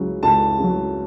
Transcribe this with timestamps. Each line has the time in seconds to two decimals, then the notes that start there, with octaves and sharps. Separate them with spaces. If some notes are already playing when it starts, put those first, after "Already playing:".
Already playing: C#2 C#3 F#3
0.23 C#2 A5
0.59 C#3 F#3